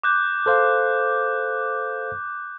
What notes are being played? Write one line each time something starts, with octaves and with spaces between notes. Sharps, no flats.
D6 F#6 G6
A4 C5 F5